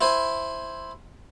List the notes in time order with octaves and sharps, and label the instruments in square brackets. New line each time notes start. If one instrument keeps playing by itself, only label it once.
[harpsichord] E4 C5 G#5